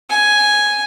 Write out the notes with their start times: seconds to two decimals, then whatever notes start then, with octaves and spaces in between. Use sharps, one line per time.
0.10 G#5